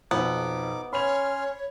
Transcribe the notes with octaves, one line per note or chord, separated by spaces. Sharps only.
B1 F2 B3 D#4 D6
C#4 C#5 B5 C6 F6 F7